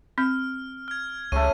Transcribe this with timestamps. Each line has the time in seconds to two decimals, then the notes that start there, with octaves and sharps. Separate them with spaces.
0.18 C4 F6 G6
0.88 F6 G#6
1.32 C#2 C#3 A3 C#6 D#7